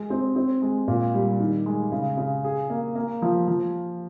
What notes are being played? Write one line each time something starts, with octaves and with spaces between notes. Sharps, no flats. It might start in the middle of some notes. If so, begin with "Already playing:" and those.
Already playing: G#3
C4
C4
G#3
A#2
G3
D#3
G#3
C#3
C#3
G#4
A#3
A#3
F3
F3